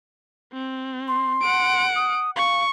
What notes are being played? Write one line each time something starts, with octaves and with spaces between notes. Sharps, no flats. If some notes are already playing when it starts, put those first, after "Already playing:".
C4
C6
F#5 D7
D#6
F5 C#6